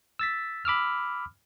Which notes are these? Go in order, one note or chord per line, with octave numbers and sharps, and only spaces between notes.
E6 A6 B6
B5 D6 E6 F6